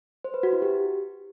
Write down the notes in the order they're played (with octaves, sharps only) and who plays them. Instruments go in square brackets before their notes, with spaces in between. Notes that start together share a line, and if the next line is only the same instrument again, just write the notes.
[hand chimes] C5
B4
F#4
E4
G4